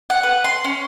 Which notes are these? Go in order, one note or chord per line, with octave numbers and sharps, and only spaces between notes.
F#5
B4
C6
C#4